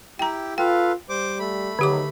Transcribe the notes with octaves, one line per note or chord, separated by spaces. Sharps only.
E4 G4 G5 A#5
F4 A4 B4 F5 G5
G3 C5 D6
A3 B5
D3 D#3 F#3 G4 D6